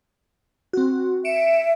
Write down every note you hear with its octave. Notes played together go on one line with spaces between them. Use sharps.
C4 F#4
E5 C#7 D7 E7